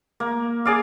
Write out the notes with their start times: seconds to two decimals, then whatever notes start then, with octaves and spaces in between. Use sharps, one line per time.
0.20 A#3
0.65 G#4 D5 F5